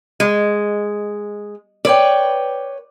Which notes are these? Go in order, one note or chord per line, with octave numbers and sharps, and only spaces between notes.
G#3
B4 C#5 D5 G5